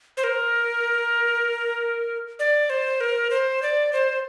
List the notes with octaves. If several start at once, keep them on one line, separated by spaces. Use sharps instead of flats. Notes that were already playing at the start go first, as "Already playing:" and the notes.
C5
A#4
D5
C5
A#4
C5
D5
C5